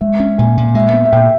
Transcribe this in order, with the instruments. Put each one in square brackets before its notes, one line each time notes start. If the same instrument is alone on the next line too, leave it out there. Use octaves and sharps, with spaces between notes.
[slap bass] G#3 [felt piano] E5
[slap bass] C#4
[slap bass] A#2 [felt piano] G#5
[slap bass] A#2
[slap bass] G#3 [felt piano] E5
[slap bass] B3
[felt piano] E5
[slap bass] A#2 [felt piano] G5